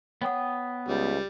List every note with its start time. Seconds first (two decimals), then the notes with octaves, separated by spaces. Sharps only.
0.22 B3 C#5 F#5 G5 D#6
0.88 C#2 G3